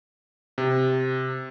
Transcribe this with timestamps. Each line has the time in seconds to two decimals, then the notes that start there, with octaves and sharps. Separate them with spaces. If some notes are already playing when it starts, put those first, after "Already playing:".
0.58 C3